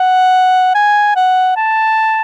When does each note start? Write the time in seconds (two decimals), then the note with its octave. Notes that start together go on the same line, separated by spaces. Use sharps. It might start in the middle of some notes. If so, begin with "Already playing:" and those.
Already playing: F#5
0.75 G#5
1.16 F#5
1.57 A5